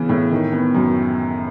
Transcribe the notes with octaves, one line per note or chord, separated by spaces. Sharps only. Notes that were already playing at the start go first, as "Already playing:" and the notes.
Already playing: C#3 E3 B3
A2
D#3
B3
F#2